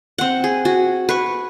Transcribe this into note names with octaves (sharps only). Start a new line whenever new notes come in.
C4 F#5
G#4
F#4
B4 C#6